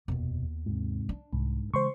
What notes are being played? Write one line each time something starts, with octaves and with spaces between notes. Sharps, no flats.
F1 D#2 B2 B3
G#2 C3
D4
C2 G#2
C#3 E3 G#3 C5 C6 C#6